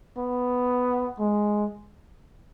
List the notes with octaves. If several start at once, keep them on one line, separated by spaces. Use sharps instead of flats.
B3
G#3